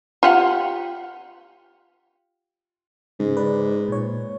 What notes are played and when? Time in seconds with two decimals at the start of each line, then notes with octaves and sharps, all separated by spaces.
0.23 F4 G4 F#5
3.20 G#2 C#3
3.37 B4 D5
3.88 A#2 C#5